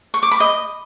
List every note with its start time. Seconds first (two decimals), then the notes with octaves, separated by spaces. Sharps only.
0.14 C#6
0.23 D6
0.31 B5
0.40 D#5